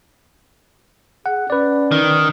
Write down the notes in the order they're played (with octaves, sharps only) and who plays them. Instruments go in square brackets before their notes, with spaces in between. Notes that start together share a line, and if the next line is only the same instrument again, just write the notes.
[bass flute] G#4 [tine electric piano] F#5
[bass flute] C#4 [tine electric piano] B4 D5
[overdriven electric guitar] D#3